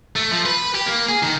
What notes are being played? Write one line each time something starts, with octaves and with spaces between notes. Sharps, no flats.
A3
F3
B4
G4
A#3
G#4
D#3